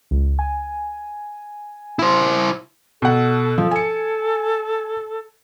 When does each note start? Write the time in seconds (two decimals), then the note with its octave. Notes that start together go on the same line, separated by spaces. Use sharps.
0.11 C#2
0.39 G#5
1.99 E4 C5
3.02 B2 A4 F#5
3.58 F3
3.71 A4 G#5 C#7